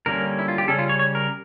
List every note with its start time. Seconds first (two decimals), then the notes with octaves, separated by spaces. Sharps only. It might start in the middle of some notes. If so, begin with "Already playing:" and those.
0.06 D3 G3 A#3 C#4 A#4
0.39 E4
0.48 F4
0.58 G4
0.68 C#3 G3 C#4 A4
0.79 F4
0.89 C#5
0.99 C#5
1.15 A#4